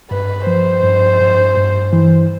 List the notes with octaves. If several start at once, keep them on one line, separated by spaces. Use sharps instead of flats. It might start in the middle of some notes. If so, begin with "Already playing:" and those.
G2 B4
F3 C5
G2
G2
G2
E3